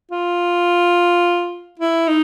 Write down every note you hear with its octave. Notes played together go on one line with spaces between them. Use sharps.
F4
E4
D#4